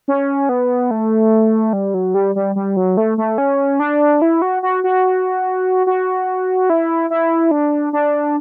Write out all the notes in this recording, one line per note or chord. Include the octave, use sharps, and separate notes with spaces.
C#4
B3
A3
G3
F#3
G3
G3
G3
F#3
A3
A3
C#4
D4
E4
F#4
F#4
F#4
F#4
E4
E4
D4
D4